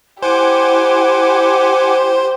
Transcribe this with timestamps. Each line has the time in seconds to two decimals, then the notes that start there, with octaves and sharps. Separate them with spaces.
0.23 E4 G4 C5 F#5 G#5 D6